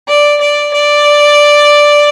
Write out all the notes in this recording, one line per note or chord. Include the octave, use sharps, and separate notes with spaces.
D5
D5
D5